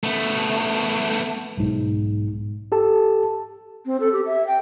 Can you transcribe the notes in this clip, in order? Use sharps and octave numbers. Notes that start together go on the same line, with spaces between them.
A3 B3
B1 G#2
G4 A4 A5
C4
A4
G4
E5
G5